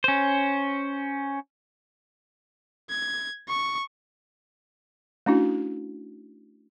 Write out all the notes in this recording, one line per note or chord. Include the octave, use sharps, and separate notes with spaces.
C#4 C5
G#6
C#6
A3 C#4 D4 E4 F#4